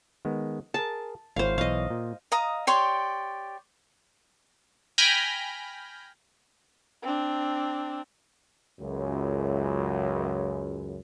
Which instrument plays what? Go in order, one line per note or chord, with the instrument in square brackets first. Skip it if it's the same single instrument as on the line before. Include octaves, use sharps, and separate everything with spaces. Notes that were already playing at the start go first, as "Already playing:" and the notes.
[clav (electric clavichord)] D#3 G#3 B3
[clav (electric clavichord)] G#4 A#4 [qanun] A5
[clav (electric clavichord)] G#1 E4 C#5 [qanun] C5 F5
[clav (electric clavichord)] B1 E3 C#5 [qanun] D#5 F5
[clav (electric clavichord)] A#2
[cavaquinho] D#5 F5 A#5 D#6
G4 C#5 D5 C6
[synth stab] G5 G#5 B5 F6 G6 A#6
[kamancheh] C4 D4
[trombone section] C#2 F#2